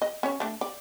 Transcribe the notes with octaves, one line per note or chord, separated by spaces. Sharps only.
D#5
C#4 C#5
A3 D4
D5